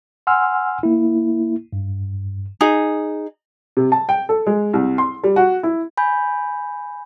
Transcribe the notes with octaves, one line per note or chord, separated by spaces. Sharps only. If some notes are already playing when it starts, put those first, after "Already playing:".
F#5 G#5 C6 E6 F6
A#3 E4
G2
D#4 G#4
C3
A5
G5
A4
G#3
C2
C6
G3
F#4
E4
G#5 B5 G6